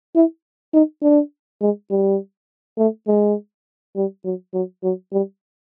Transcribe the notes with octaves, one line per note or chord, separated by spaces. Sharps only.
E4
D#4
D4
G#3
G3
A3
G#3
G3
F#3
F#3
F#3
G3